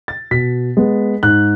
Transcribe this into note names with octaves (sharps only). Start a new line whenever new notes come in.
A6
B2 B6
G#3 B3
G#2 F#6